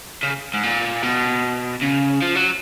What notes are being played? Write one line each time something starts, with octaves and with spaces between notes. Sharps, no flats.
C#3
G#2
A#2
B2
C#3
F3
F#3